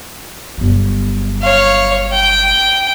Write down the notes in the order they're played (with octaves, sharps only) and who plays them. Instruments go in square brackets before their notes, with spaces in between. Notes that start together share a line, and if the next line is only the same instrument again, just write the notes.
[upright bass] G1 F#3
[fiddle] C#5 F5
G5